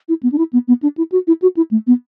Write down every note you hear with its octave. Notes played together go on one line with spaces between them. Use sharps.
E4
B3
D4
E4
B3
B3
D4
E4
F#4
E4
F#4
E4
A3
B3